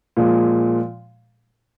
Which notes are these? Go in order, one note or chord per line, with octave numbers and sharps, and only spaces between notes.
A#2 F3 G#3